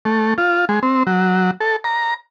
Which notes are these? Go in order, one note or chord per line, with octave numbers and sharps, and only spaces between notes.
A3
F4
G#3
C4
F#3
A4
A#5